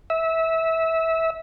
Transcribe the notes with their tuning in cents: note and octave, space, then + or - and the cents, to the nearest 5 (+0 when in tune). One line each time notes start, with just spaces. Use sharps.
E5 -20